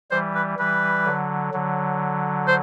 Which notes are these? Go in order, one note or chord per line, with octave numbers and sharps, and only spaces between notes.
E3 G3 C5
B4
E3 G3 B4
D3 F#3
D3 F#3
C5